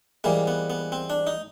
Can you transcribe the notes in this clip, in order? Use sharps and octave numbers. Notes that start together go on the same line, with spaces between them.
G#2 E3 G3 A#3
B3
B3
C4
D4
D#4